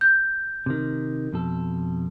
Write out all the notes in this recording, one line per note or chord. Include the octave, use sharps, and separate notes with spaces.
G6
C3 D#3
F2 B2 A4